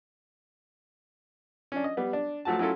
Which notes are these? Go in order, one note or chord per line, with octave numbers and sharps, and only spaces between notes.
C#4 D4
D#5
G3 B3
D4
F3 F#3 A3 F#4 A5
F#3 C#4 E4 F4 A4